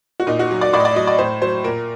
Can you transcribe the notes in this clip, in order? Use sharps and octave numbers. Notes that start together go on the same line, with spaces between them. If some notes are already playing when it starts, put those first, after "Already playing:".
F#4
A#2 D#4
F#4
F#3
D5
A2 D5
D#5
D5
F#3 D#5
D5
A2 C5
F#3 C5
A#2 A#4